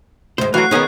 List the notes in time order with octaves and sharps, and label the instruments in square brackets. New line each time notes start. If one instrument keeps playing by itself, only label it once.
[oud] D2 G#2 [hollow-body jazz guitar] C5
[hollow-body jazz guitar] E3 F#3 [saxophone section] F#4 [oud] F5 [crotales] F#6 C7
[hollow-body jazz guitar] D#3 G#3 D#4 [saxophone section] B3 [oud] C#4 G#4